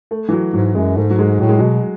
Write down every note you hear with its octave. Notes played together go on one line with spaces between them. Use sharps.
A3
E3
F#3
G#2 F#3
F#2 G#3
G#2 A3
F#3
G#3
A2 F#3
G#3
B2 F#3